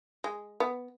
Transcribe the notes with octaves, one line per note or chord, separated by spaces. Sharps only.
G#3
B3